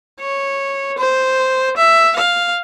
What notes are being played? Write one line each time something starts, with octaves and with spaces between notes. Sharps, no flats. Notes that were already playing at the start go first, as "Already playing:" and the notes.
C#5
C5
E5
F5